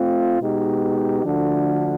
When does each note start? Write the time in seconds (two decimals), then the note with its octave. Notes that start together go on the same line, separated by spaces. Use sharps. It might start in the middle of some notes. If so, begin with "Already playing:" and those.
Already playing: A3 C4 F4
0.41 B2 G#3 B3 D#4 G4
1.23 D3 F3 A3 D4 F#4